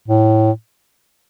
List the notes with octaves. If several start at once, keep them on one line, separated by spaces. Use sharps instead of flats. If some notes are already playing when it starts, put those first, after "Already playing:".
A2